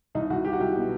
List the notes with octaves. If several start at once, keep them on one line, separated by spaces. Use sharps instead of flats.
C2 D#4
C2 F#4
C2 G4
F#4
C2 G4
B2